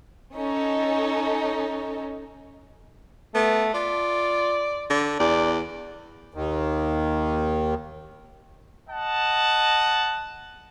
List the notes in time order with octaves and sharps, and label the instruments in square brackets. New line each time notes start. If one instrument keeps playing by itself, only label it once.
[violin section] C#4 D#4 A4
[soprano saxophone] A3 [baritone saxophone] B3
[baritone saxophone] F4 [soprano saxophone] D5
[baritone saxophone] D3
[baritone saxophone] E2 [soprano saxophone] D5
[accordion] D#2 D#3
[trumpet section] D#5 F#5 A5